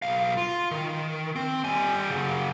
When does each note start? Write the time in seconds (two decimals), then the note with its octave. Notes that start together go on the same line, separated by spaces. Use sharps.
0.02 B1 F5
0.37 F4
0.71 D#3
1.36 C4
1.64 G3 G#5
2.09 C#3 F#3